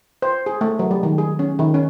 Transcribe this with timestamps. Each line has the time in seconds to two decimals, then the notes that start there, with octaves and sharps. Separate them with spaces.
0.22 C5
0.46 G#4
0.61 A3
0.79 F#3
0.91 G3
1.03 D#3
1.18 G#4
1.39 C#4
1.59 D#3
1.74 C#4